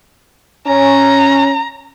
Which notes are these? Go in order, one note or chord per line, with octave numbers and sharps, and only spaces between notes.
C#4 A#5